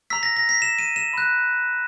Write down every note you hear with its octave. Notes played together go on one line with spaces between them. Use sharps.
A#5 E6 B6
A#6
A#6
B6
E7
D#7
E7
B5 F#6